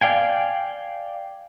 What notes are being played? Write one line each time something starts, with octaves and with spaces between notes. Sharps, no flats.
D5 F5 G5 G#5